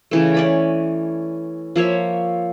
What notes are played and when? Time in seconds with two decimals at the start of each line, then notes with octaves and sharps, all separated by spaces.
0.11 C#3 E3 A3
0.34 C#4 D5 B5
1.76 F3 A#3 C#5 E5